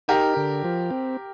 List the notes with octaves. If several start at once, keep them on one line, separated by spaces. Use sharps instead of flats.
D#4 G4 A#4
D3
F3
C4